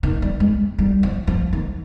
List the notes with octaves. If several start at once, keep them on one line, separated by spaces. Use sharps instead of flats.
D#3
G3
G#3
G3
F3
F3
D#3